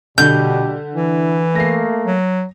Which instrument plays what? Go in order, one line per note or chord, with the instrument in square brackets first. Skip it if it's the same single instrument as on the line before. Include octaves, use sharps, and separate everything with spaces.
[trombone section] A#1 G3 G4 [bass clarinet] B2 [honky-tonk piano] D3 [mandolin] G6
[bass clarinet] E3 [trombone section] E4
[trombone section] A3 A#3 [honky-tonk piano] A#6 C7
[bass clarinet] F#3